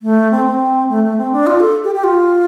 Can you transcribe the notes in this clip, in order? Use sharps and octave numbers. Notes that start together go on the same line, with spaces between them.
A3
C4
C4
A3
A3
C4
D4
F4
A4
G4
G4
F4